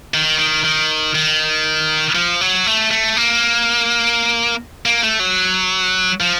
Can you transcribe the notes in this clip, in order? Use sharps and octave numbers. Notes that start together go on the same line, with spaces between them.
D#3
D#3
D#3
D#3
F3
F#3
A3
A3
A#3
A#3
A3
F#3
F3